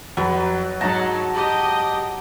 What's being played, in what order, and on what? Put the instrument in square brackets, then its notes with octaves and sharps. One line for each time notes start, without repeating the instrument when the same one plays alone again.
[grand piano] F2 [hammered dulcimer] F#3 B4
[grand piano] G#2 D#4 A#6 [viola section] F#3 [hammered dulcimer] A5 A#5
[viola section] G4 D#5